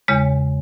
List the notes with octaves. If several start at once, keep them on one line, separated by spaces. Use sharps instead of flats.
E2 C#3 G#3 C#5